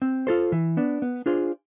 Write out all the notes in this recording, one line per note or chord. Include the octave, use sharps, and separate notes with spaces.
C4
F4 A4 C5
E3
B3 D4
B3
D4 F4 G#4 C5